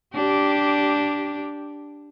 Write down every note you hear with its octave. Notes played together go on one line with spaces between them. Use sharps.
D4 G4